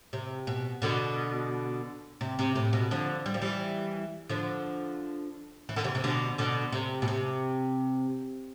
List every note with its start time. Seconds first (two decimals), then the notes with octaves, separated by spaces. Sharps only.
0.13 C3
0.47 B2
0.82 B2 D3
2.21 C3
2.39 C3
2.55 A2
2.73 B2
2.91 D3 F3
3.26 G3
3.34 F3
3.41 E3 G3
4.29 D3 F3
5.69 E3
5.76 D3
5.84 C3 E3
5.95 C3
6.04 B2 D3
6.38 B2 D3
6.72 C3
7.02 B2
7.08 C3